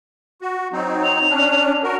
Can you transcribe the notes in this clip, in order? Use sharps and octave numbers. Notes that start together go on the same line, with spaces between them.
F#4
F#3 C4 D#4
F7
C#4 D4
F#4 A#4